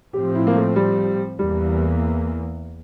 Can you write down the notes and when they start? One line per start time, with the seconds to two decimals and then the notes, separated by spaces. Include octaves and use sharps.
0.13 A2 F3 C4 G4
0.35 E4
0.47 A#3
0.56 A3
0.76 G3
1.39 E2 E3 G3 A#3